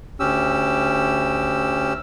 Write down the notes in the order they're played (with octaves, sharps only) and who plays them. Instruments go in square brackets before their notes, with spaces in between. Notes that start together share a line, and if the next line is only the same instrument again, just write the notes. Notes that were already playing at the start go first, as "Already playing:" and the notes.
[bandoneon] D2 C#4 G4 E6